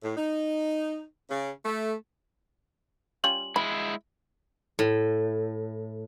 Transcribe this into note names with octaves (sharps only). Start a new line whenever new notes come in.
A2
D#4
C#3
A3
G3 C#4 F4 F#7
G#3 E4 B5
A2